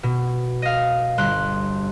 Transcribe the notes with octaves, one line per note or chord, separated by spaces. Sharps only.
B2
D#5 F5
G1 C6 F#6